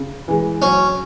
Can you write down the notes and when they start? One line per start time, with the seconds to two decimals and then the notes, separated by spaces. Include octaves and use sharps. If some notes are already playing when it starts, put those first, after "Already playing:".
Already playing: C#3
0.28 E3 G#3
0.62 F#3 C#4